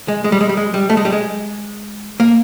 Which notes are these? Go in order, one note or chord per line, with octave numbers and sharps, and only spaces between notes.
G#3
G#3
G3
G#3
G3
G#3
G3
A3
G#3
G3
G#3
A#3